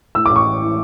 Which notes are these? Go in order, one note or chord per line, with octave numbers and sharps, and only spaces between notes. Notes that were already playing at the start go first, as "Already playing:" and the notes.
A2 E6
D6
A1
C#6
E3
E3